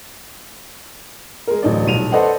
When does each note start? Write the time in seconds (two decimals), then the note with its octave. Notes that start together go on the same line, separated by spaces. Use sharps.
1.47 G#3 A#4
1.62 D1 A1 D#4 D5
1.85 D#1 B1 D#7 F7
2.12 A4 B4 C5 D5 D#5 F#5